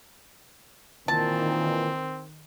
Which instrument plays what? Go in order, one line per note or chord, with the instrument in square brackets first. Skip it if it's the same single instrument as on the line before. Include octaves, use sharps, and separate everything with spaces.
[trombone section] A#2 E3 [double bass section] D#3 [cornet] C4 [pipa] A5